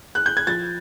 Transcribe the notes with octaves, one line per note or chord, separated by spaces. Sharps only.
F#6
G6
G#6
F3 A6